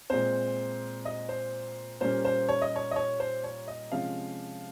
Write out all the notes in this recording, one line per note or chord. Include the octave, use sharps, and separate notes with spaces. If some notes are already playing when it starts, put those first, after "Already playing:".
A#2 G#3 C4 C5
D#5
C5
A#2 G3 A#3 C#4 C5
C5
C#5
D#5
C#5
D#5
C#5
C5
C#5
D#5
C3 F3 G#3 C#4 F5